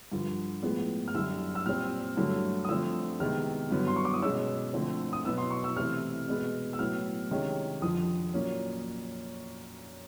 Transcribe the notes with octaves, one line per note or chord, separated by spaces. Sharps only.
G2 D3 F3
A2 F3 G#3 B3
F6
F#2 D3 G3 E6
E6
A#2 G3 C4 F6
G2 D3 F#3 A3
D#6
D3 F3 A3 C4 E6
C3 D#3 G#3 B3 F6
G2 D3 F#3 B3
C6
C#6
D6
D#6
B2 G#3 C#4 E6
D3 F3 A3 C4
D#6
B2 F#3 B3 E6
C6
C#6
E6
C3 E3 A3 C4 F6
B2 G#3 B3
E6
A2 F#3 B3 F6
C3 D#3 G#3 C#4
F2 D3 F3 D#6
A#2 F#3 A#3 C#4